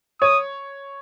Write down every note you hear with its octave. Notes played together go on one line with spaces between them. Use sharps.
C#5 D#6